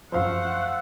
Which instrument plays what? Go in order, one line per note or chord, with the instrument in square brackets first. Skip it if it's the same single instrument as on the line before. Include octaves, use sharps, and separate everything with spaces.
[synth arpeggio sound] F#2 F3 [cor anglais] A3 [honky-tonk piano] C5 F5 [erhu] F#5